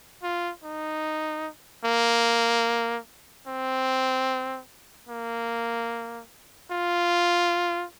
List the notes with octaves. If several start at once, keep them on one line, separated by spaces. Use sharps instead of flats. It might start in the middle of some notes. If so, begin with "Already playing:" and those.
F4
D#4
A#3
C4
A#3
F4